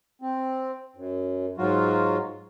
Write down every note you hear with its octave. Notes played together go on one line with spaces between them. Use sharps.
C4
F#2
G#2 F#3 F4 F#4